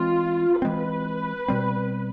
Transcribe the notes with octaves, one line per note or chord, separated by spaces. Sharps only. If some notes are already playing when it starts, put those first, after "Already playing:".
Already playing: E3 G#3 C4 F4
E3 G#3 C4 B4
B2 G3 C4